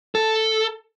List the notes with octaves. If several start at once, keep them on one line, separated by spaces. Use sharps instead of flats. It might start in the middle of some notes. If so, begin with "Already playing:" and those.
A4